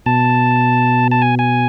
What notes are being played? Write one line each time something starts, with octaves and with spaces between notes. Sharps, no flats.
B2 A5
A5
G#5
G#5